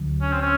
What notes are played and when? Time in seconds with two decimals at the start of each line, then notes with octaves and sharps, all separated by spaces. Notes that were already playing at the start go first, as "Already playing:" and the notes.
Already playing: D2 D3 F#3
0.22 C#4
0.33 C4
0.42 C#4